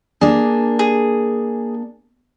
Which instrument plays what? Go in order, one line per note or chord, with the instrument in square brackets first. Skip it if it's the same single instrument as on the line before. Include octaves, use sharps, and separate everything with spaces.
[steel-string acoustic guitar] A#3 D4 [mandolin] G#4
[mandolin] G#4